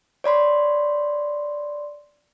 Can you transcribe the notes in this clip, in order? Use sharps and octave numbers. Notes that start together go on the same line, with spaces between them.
C#5 D5 B5 C6